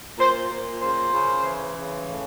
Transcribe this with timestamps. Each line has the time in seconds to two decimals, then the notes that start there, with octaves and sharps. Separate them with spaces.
0.18 A#2 C5
0.50 A#2
0.82 C#3 C5
1.13 C#3
1.45 E3
1.77 C#3
2.08 A2